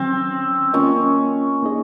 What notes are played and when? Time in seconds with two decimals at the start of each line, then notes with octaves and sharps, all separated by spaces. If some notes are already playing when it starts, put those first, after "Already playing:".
Already playing: D#3 F#3 C4 C#4
0.73 A#3 C#4 F4 A#4 D#5
1.62 A#3 D#4 G#4 D#5